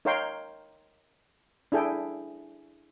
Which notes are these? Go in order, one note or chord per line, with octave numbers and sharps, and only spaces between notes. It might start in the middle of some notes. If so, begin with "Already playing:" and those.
D#4 A#4 C#5 F5 G5 C6
D4 E4 G#4 A4 G5